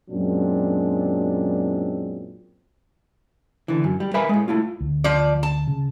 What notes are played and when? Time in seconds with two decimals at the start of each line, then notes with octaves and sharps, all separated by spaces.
0.10 F#2 A#2 F#3 G#3 C4 D4
3.68 D3 E3
3.84 F#2
4.00 G3
4.14 A#4 B4 E5 F5 G#5 B5
4.29 A2 G#3
4.48 A3 E4 F4
4.81 D2
5.04 F3 D5
5.43 A5
5.67 C#3